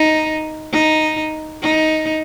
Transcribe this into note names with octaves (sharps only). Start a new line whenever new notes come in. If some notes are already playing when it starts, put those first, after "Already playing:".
Already playing: D#4
D#4
D#4